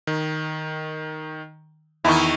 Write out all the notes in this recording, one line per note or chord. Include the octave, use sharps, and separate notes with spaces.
D#3
E2 D#3 D#4 E4 C#6